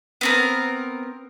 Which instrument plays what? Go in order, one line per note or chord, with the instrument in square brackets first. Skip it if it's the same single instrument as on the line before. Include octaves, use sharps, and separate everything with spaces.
[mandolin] B3 C4 A#4